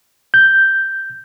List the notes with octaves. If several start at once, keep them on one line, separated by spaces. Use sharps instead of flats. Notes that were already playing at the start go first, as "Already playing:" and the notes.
G6